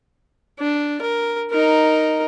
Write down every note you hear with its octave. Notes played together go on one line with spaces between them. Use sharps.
D4
A#4
D#4 A#4